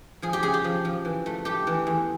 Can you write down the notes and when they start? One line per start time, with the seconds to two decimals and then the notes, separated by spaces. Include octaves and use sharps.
0.22 F3 G#4
0.33 G4
0.43 C#3 G#4
0.54 G4
0.64 F3
0.85 F3
1.05 E3
1.26 A3
1.45 A3 G4
1.67 E3
1.87 E2